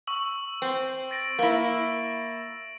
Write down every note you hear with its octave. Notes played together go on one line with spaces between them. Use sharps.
C#6 E6 F#7
C4
A6 A#6 D7
A#3 E4